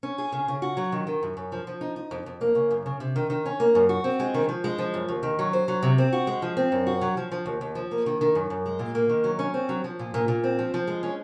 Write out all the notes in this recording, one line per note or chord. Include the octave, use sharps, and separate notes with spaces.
C#4
G#4
C#3
C#3
F#4
F#3
D#3
D#3
F#2
F#2
F3
F3
D#4
D#4
F2
F2
A#3
C#3
F#2
C#3
C3
D#3
D#3
C#4
A#3
F#2
F#4
C4
G#3
D#3
F3
G#3
F3
F#2
D#2
D#3
F#3
C5
F#3
C3
C4
F#4
G#3
F3
C4
F#2
F#4
F#3
F3
F3
D#2
D#2
F3
A#3
D#3
D#3
F#2
F#2
G#3
A#2
A#3
D#3
F#3
C#4
C4
F#3
F3
A#2
A#2
A#2
C4
F3
F3
G#3
C#4